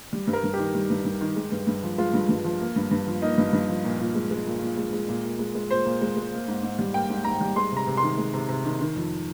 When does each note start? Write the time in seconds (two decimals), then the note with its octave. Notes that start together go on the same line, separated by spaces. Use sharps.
0.13 G3
0.27 G2
0.33 A#4
0.44 G2
0.54 G4
0.59 D#3
0.74 G3
0.90 G2
1.05 G2
1.21 D#3
1.36 G#3
1.52 G2
1.67 G2
1.83 F3
1.98 G#3 F4
2.13 G2
2.29 G2
2.44 F3
2.60 A#3
2.76 G2
2.91 G2
3.07 F3
3.22 A#3 D#4
3.38 G2
3.53 G2
3.69 F3
3.84 A#2
4.00 A#2
4.15 G#3
4.31 G#3
4.46 A#2
4.62 A#2
4.77 G#3
4.93 G#3
5.09 A#2
5.24 A#2
5.39 G#3
5.55 G#3
5.70 A#2 C5
5.85 A#2
6.01 G#3
6.17 G#3
6.32 A#3
6.48 G#2
6.63 G#2
6.79 G3
6.94 A#3 G5
7.10 G#2
7.25 G#2 A#5
7.41 G3
7.56 G#3 C6
7.72 C3 A#5
7.87 C3
7.97 C6
8.03 D#3
8.18 G#3
8.34 C3
8.49 C3
8.65 D#3
8.81 D#3
8.96 F2